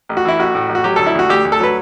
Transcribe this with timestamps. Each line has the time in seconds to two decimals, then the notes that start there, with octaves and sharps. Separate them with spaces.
0.09 A1
0.17 F#4
0.25 E3 E4
0.39 A1 F#4
0.55 A2
0.69 A1
0.75 F#4
0.84 F#3 G4
0.96 D2 A4
1.06 E4
1.15 D2 F#4
1.29 D2 G4
1.45 D2
1.52 A4
1.60 F#3 B4